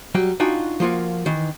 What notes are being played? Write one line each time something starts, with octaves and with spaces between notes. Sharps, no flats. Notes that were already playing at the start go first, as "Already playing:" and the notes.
F#3 G3 G5
D4 D#4 F4 F#4 G5 G#5
F3 A#3 F4 F#4
D#3 E3